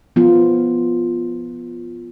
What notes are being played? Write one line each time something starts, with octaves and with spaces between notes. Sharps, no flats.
F3 B3 F4